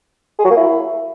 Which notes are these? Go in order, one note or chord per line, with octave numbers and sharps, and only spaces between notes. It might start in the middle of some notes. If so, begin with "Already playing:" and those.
G#4
F#3
A#3
E4